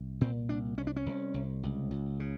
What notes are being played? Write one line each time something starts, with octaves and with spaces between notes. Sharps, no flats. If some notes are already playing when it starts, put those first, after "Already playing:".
Already playing: C2
A#2 C4
C2 D4
C2 C#4
D4
C#4
C2
C2
C#2
C#2
C#3